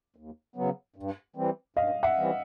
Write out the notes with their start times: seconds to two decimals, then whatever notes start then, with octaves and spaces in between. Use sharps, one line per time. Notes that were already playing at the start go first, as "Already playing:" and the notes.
0.16 D#2
0.56 C#3 F#3 B3
0.96 G2
1.36 E3 G3 C4
1.77 G2 D#5 F5
2.03 E5 F#5
2.17 E3 G3 C4